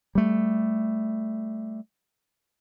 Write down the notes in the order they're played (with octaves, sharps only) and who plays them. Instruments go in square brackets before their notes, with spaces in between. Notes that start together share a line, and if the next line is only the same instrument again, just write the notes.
[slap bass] G3 A3